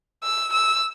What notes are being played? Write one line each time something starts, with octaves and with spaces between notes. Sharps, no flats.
E6
E6